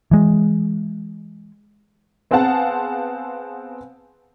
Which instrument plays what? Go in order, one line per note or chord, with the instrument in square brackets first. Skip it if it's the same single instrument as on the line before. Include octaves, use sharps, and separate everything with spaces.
[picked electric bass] E3 G#3
[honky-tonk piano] B3 C4 G#4 F5 F#5 A5